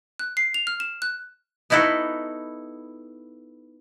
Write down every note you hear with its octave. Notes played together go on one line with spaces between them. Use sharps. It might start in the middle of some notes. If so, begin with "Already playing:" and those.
F#6
C7
F7
F6
E7
F#6
B3 D#4 E4 F#4 A4